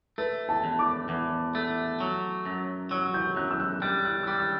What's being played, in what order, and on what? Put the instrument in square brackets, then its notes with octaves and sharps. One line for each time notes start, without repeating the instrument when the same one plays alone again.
[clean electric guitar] A3 [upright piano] B4
[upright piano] A5
[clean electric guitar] E2
[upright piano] D6
[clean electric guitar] E2
A3
F#3
F#2
[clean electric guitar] F#3 [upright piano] E6
[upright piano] G6
[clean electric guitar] F#2 [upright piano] F#6
[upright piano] E6
F#6
[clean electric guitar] G3 [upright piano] F#6
[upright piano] F#6
E6
[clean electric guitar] G3 [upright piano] D6
[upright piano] E6